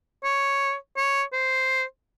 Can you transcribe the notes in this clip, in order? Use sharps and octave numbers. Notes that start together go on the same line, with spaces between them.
C#5
C#5
C5